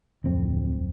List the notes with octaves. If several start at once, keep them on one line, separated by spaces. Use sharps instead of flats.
D1 F2 C4